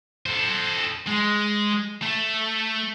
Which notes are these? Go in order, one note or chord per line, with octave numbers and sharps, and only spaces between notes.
A4 C5
G#3
A3